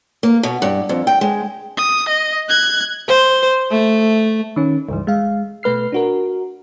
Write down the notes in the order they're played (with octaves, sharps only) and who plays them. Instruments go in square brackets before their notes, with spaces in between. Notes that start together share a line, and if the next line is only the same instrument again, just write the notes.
[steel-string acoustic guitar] A#3
B2
G2
F2
G5
G#3
[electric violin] D#6
D#5
F#6 G#6
[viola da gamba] C5
A3
[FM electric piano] D#3 C#4
C#2 G2 E3
G#3 F5
B2 A3 B4 F6 C7
D4 F#4 A#4